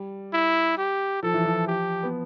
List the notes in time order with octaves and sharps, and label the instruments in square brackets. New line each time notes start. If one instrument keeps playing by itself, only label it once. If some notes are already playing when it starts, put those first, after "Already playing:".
Already playing: [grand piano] G3
[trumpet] E4
G4
[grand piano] F3 [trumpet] A4
[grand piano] E3
F3
[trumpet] G4
[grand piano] B3